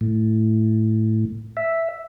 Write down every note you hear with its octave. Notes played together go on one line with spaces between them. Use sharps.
A2
E5